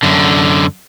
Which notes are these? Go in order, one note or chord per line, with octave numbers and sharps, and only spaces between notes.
F#2 D3